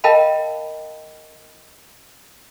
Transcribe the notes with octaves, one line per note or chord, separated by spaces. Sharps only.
A#4 D#5 F5 G5 A5 B5